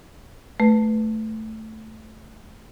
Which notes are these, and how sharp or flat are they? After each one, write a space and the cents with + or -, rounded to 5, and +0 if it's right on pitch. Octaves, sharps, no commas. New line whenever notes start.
A3 +0 B4 +0